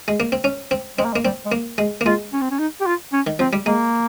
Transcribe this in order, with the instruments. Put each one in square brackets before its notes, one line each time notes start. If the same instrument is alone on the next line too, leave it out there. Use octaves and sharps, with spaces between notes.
[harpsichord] G#3
A#3
C4
C#4
C4
[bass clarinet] G#3 [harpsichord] C4
[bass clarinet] A#3
G#3
[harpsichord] A#3
[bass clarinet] G3 [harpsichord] C4
[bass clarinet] G#3
[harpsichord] A#3
G#3
A#3
[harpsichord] G#3 [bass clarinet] F4
[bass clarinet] C#4
C4
C#4
D#4
G4
F4
C#4
[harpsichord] D#3
[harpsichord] F3 [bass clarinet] C4
[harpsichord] G3
[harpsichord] G#3 [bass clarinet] A#3